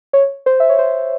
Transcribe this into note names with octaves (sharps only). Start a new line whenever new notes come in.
C#5
C5
E5
C#5
C5